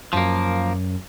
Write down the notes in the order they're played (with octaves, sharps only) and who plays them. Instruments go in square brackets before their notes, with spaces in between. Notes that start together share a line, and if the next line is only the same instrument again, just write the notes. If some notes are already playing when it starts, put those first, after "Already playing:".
[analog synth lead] F#2 [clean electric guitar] F3 A#3